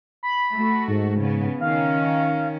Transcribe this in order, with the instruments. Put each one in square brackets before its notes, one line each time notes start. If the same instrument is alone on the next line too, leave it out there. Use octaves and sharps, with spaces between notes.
[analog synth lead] B5
[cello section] A3 F#4
[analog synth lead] G#2
[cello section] C#3 B3
[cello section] D#3 C#4 [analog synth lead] F5